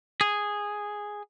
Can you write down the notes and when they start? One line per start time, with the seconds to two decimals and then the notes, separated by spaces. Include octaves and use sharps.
0.21 G#4